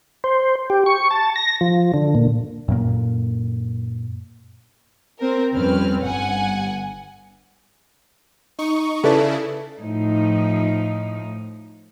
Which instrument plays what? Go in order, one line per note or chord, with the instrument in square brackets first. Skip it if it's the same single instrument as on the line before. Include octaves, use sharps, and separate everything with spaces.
[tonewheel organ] C5
G4
C#6
A5
A#6
F3
D3
A#2
[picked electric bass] F#2 A#2 A#3
[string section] C4 A#4
F2 G3 C4 C#4 B4 F6
G1 G2 F#5 G#5
[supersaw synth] D#4 C#6
[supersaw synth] C#3 E4 [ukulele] A4 B4 D5
[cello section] A2 F3 D#4